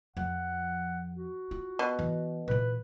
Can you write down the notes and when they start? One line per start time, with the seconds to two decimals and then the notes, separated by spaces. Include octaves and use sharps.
0.17 F2 F3 F#5
1.15 F#4
1.51 F4
1.79 B2
1.99 E3
2.48 A#2 E3 B4